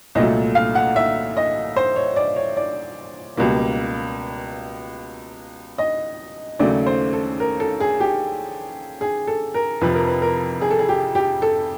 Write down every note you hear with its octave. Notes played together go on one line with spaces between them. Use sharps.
C2 A#2 F#3 A3 D#5
F5
F#5
E5
D#5
C5
C#5
D5
C#5
D5
C#2 B2 G3 A#3
D#5
D#2 C#3 F#3 A3 D5
C5
A4
A#4
A4
G#4
G4
G#4
A4
A#4
F2 C3 F3 B4
A#4
B4
A#4
G#4
A4
G#4
G4
G4
A4